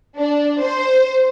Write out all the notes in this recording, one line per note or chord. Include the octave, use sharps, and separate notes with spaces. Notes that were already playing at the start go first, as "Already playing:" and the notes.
D4
C5